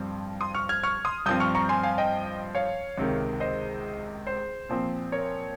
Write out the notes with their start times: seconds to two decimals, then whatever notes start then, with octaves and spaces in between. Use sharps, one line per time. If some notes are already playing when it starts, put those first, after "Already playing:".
Already playing: G2 F3 C4
0.41 C6 D#6
0.55 C#6 F6
0.69 F6 G#6
0.83 C#6 F6
1.05 C6 D#6
1.26 G2 F3 C4 D#6 G6
1.40 C#6 F6
1.55 A#5 C#6
1.69 G#5 C6
1.83 F5 G#5
1.98 D#5 G5
2.55 C#5 F5
2.98 C#2 C3 D#3
3.40 C5 D#5
4.27 C5
4.69 A#2 F3 C4
5.12 A#4 C#5